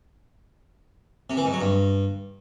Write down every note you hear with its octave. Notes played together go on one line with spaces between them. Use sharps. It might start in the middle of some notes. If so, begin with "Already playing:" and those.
C3
E3
G#2
F#3
G2